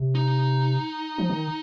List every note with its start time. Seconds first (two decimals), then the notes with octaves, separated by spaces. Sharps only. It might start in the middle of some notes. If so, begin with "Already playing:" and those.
Already playing: C3
0.15 D#4
1.18 F3
1.30 D#3